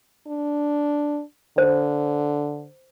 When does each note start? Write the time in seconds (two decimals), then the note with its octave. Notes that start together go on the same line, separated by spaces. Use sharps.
0.27 D4
1.58 D3 C5